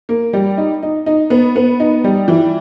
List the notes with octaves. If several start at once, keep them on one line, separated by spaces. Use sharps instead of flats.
A#3
G3
D#4
D#4
D#4
B3
B3
D#4
G3
E3